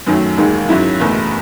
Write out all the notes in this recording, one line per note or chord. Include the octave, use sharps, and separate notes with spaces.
F#2 D#3 F#3 A3
E1 D#2 D#3 G#3
G#2 F#3 C#4 E4
F#1 E2 B2 A3